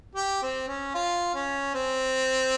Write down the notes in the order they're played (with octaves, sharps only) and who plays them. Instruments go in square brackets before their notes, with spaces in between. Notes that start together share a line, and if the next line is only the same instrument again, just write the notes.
[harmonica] G4
C4
C#4
F4
C#4
C4